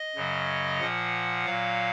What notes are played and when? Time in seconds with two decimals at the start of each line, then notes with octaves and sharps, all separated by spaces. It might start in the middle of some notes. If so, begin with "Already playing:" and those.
Already playing: D#5
0.15 F#2 C#3 F#3
0.80 A#2 F3 F#5
1.46 A#2 F#3 F5